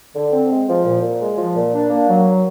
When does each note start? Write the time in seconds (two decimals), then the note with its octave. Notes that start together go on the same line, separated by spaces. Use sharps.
0.15 D3
0.32 C4
0.51 G#3
0.68 F3
0.85 A#2
1.02 A#2
1.21 G#3
1.38 F3
1.55 A#2
1.73 D4
1.90 A#3
2.08 F#3